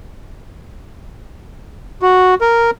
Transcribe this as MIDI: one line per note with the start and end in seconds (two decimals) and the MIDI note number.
2.02 2.34 66
2.41 2.71 70